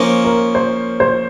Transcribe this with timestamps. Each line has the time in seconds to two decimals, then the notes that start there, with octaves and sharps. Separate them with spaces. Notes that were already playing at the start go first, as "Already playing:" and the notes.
Already playing: F3 A#3 C#4
0.25 A#4
0.55 C5
1.00 C5